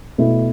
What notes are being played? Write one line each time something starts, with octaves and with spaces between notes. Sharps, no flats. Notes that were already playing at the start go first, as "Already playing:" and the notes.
B2 A3 E4